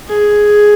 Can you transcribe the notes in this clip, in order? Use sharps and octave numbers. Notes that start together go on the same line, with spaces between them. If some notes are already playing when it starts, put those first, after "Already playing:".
G#4